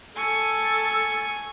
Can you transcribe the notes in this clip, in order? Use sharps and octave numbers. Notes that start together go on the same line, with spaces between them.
A4 G#5 C#6